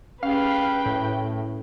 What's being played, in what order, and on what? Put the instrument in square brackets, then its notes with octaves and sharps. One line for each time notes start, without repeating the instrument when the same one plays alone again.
[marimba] C#4 G4 G#4 [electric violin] B4 G5 [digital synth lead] F5
[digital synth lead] A2